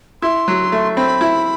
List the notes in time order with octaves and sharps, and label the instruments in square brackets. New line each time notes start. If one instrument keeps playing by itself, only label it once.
[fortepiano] E4 [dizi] C6
[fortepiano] F#3
A3
[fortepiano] C4 [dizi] B5
[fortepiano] E4